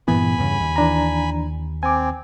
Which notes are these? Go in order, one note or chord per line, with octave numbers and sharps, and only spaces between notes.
G2 A#2 E3 B3 G#5 B5
E2 G2 C#3
D#2
E3 D4 A#5
C4 G#5 D6